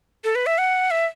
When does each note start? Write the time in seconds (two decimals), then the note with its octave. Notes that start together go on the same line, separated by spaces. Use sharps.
0.24 A4
0.35 B4
0.46 E5
0.58 F#5
0.91 E5